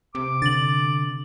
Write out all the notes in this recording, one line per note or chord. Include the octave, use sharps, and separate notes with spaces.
C3 D6
D3 A6 F#7